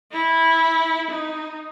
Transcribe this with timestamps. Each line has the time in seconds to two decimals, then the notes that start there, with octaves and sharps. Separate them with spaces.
0.12 E4
1.10 D#4